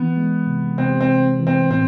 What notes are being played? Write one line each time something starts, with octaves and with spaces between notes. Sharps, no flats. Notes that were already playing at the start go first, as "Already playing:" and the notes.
Already playing: E3 B3
G#3
C3
C3 C4
C4
C3
E3
C4
A2 C4